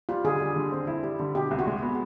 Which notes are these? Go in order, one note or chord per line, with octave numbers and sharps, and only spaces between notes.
G3 F4
D3 G#4
G3
D3
C4
E4
G3
D3
B2 G4
C2
F#4
G#3
B3